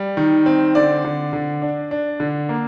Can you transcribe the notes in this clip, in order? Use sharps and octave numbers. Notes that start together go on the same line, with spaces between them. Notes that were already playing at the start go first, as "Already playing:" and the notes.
Already playing: G3
D#3
C4
D3 D5
D3
D3
D4
D4
D3
A#3